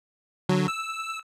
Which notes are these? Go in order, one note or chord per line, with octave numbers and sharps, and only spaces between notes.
D3 F#3
E6